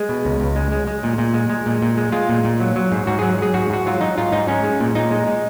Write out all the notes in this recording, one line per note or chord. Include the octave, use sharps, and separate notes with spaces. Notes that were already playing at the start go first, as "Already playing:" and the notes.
Already playing: G#3 G#4
B2
C#2
C#2
G#3
G#3
G#3
A#2
A#2
G#3
G#3
A#2
A#2
G#3
G#3 F4
A#2
A#2
F#3
F#3
G#2
G#2 F#4
F#3 G#4
F#3 G#4
G#2 F#4
G#2 F#4
F#3 F4
F#3 D#4
G#2 F4
G#2 D#4
G#3 C#4
G#3
A#2
A#2 D#4
G#3
G#3